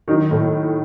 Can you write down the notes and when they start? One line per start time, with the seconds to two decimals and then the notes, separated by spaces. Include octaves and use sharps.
0.08 D#3 F#3 D#4
0.31 A2